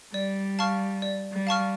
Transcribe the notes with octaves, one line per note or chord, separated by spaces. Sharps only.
G3 D5
F5 A5 C#6 F6
D5
G3
F5 A5 C#6 F6